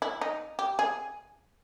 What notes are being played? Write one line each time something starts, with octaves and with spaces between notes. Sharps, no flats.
E4
D#4
G4
G#4